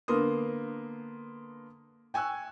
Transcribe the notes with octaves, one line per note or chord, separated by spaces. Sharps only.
D3 A#3 B3 A#4 C6 D#6
G5 G#5 C#6 E6 F#6